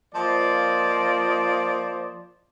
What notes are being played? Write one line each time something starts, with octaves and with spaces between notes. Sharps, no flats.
F3 A#3 F4 C5 D5 D#5